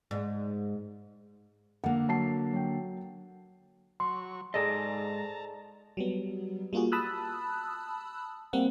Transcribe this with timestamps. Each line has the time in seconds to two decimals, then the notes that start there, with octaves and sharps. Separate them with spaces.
0.11 G#2
1.84 D3 A#3 F#5
2.08 F#3 A5 C7
2.53 F#3 G5
4.00 F#3 C6 C#6
4.54 G#2 G#4 A4 D5 D#5 A5 A#5
5.97 F#3 G3 B3
6.73 G3 A#3 F4 F#4 G#4
6.92 A5 B5 D#6 E6 F#6
8.53 G3 A#3 C4 F#5